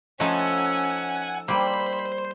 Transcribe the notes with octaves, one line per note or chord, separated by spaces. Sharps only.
F3 A3 C#4 D#4 A4 F#5 G#5
G3 A#3 C5 B5